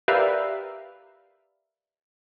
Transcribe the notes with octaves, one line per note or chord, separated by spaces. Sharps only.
G4 A#4 B4 D5 E5 F5